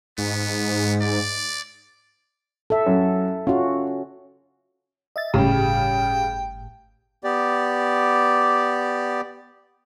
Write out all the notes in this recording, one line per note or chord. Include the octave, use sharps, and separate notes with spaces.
G#2 B3
D5
A4 E5
F#2 C#4
C#4 F4 F#4
D#5 E5 A6
G1 A2 C#3 G3 G5
B3 G4 D5